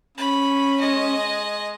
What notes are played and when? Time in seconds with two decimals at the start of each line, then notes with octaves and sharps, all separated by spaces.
0.18 C#4 B5
0.80 G#3 D#5